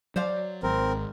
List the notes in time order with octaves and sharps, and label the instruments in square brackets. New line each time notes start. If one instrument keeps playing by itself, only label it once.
[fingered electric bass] F#3 [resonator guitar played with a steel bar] C5 D5 F5
[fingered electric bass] G#1 [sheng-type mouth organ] C4 A#4